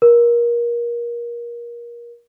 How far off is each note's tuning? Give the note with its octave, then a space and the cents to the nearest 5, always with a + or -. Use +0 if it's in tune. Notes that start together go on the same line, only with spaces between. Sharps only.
A#4 +25